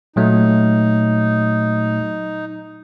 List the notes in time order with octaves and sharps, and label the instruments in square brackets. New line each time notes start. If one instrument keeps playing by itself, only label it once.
[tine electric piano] A#2 F#3 A3 [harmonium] D#4